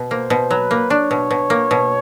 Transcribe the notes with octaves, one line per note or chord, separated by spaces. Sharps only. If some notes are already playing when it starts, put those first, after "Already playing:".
Already playing: B2
A#3 C5
B2
F#3 B4
A#3
D4 C#5
B2
B2
A#3
B2